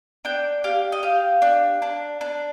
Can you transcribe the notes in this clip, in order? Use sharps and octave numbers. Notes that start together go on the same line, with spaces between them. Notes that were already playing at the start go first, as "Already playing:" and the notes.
D4 G5
G4 F5
D#5
G4 F5
D4
D4
D4